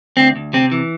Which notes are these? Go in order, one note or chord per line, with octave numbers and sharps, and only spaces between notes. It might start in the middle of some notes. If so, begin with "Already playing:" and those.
D2 C4
D2
C3 C4
E3